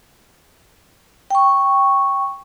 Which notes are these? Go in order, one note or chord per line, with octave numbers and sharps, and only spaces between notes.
G5 C#6